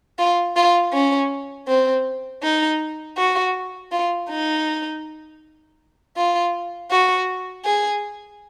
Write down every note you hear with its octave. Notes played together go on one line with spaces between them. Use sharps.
F4
F4
C#4
C4
D#4
F#4
F4
D#4
F4
F#4
G#4